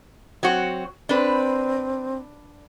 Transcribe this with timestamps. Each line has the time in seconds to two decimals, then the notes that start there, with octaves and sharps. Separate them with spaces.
0.43 F#3 C4 F#4
1.09 C4 D4 B4